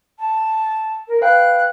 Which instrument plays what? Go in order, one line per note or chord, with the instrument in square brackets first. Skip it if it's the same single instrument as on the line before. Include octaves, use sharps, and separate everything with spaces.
[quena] A5
A#4
[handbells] B4 F5 G5 [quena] F#6